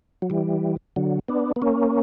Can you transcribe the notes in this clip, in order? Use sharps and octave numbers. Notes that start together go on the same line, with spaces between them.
F#3
E3 G3
D3 F#3
B3 D4
B3
A#3 C#4